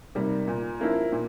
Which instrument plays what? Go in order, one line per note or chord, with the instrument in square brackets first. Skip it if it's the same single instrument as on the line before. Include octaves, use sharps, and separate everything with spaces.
[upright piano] C3 D#3 G3 A#3
A#2
F3 A#3 C#4 E4
A#2